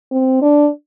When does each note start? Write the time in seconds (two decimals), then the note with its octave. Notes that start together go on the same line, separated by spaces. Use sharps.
0.11 C4
0.42 D4